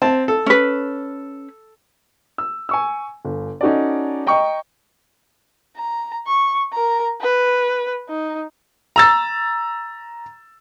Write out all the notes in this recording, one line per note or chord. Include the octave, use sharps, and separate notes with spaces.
C4 A5
A4
C#4 B4
E6
G#5 C#6 E6
G1
C#4 D#4 F#4 A4 D5
D#5 G5 A#5 C#6
A#5
C#6
A#4 A#5
B4
D#4
A#5 E6 A6